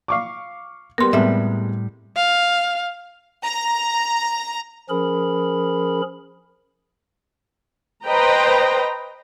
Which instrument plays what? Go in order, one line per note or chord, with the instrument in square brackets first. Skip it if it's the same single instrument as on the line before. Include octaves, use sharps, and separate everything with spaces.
[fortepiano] F5 C#6 D6
[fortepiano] G3 B3 [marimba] A#4 C6
[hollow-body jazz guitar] A2 G3 [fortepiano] C3 G#3 B3 [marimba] E5
[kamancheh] F5
[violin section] A#5
[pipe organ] F3 C#4 G#4 A#4 B5
[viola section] B4 C5 D#5 G5 A#5